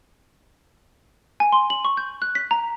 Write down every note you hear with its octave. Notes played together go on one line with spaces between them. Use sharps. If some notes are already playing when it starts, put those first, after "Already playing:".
G#5
C6
F#7
C#6
G6
F#6
B6
A#5